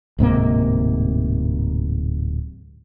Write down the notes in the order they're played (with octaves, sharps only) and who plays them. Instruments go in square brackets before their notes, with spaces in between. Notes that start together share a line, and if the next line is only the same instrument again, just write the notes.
[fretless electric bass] D1 G#2 C3 A#3